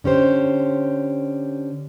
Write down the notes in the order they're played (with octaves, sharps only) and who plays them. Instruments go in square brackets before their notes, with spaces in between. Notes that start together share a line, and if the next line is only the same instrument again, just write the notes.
[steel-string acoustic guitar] D3 C#4 G4 C5